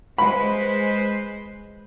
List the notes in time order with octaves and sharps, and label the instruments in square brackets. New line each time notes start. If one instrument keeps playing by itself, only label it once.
[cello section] G#3 B4 C5 [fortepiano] B5